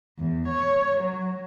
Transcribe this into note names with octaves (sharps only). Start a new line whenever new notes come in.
E2
C#5
F#3